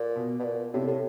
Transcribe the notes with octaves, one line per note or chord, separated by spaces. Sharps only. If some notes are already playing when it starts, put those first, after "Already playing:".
Already playing: A#2
B2
B2
A#2
A2 C3
A2